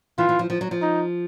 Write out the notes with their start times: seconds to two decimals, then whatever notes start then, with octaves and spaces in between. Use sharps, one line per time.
0.18 E3 F4
0.29 E3
0.39 F3
0.50 F3
0.61 F#3
0.71 F3
0.82 D#4